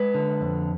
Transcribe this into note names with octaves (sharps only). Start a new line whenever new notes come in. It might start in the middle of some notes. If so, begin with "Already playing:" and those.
Already playing: G#3 B4
D3
F2